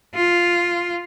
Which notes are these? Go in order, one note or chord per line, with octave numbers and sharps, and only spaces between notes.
F4